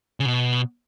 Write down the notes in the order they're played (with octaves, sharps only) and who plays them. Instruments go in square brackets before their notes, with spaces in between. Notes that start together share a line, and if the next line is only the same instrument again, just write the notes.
[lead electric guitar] C#3
B2